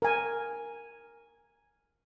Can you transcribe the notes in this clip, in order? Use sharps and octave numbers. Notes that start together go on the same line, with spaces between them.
A#4 G#5